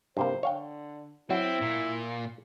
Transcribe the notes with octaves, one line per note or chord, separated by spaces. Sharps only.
G2 C3 A#3 C5
D3 C#5 F5 G5
F#3 C4 E4
A#2